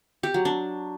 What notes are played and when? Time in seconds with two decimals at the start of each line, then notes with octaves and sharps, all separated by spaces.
0.23 G4
0.34 F#3
0.45 D4